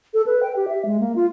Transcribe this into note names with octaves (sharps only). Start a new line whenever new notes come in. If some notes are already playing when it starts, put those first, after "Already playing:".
A4
B4
G5
G4
E5
G#3
A#3
F4